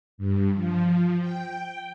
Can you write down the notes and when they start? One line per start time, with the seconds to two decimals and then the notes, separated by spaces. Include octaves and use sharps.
0.18 G2
0.55 F3
1.20 G5